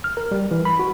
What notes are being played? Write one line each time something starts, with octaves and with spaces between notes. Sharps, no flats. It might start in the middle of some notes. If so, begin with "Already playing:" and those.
F6
A#4
G3
E3
B5
F#4